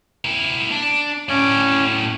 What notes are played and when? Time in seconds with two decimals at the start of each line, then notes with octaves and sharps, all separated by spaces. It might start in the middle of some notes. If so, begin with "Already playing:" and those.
0.25 E4 A#4
0.71 D4
1.29 A2 C#4 D5